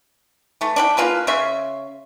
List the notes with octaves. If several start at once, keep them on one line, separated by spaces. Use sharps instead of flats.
E3 A3
D4 B4 G5
A#3 F4 G#4 B4
C#3 C#5 E5 C6